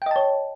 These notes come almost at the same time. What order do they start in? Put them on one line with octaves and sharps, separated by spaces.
G5 D#5 A5 C#5